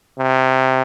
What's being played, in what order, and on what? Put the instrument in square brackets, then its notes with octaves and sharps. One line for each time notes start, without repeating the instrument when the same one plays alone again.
[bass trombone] C3